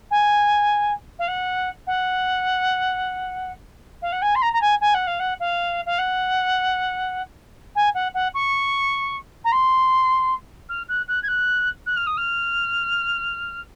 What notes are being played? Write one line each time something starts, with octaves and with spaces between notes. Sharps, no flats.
G#5
F5
F#5
F#5
F5
F#5
G#5
C6
A#5
A#5
G#5
G#5
F#5
F5
F#5
F5
F5
F#5
G#5
F#5
F#5
C#6
A#5
C6
F6
F#6
F#6
G#6
F#6
F#6
F6
D#6
F6